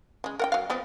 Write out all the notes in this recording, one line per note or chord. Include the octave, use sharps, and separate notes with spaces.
C#3 G#3
A#4 F#5 G5
F#3 F5
F3 B3 C4